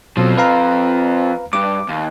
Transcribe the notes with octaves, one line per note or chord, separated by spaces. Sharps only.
B2 F3 F#3 C4
B4 F5 A#5
G2 D6
D#2